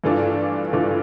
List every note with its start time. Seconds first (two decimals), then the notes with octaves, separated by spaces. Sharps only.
0.04 G2 E3 A3 D4 F4
0.73 G2 E3 A3 D4 F4